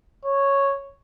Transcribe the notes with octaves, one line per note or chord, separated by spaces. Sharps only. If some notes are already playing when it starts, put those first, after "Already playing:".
C#5